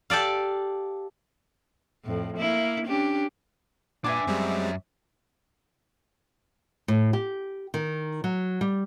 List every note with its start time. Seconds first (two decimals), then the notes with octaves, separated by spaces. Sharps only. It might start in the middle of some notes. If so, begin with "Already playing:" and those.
0.10 G4 A4 D5 F5
2.04 F2 A2
2.37 A#3 E4
2.85 C#4 D4 G4
4.04 A#2 D4 B4 E5 G#5 D6
4.27 F#2 G3 G#3 C4
6.88 A2
7.13 G4
7.74 D#3
8.24 F#3
8.61 G3